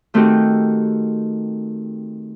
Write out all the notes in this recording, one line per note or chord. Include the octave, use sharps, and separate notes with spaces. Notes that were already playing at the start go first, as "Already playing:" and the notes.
D#3 A3 C4 D#4 F#4 G4